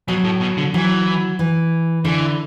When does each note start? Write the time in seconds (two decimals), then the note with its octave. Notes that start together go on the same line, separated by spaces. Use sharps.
0.08 B2 F#3
0.24 A2
0.41 B2
0.57 D3
0.74 E3 F#3
1.39 E3
2.05 D3 E3